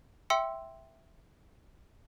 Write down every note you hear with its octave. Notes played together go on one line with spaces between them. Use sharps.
E5 G5 C6 E6 C#7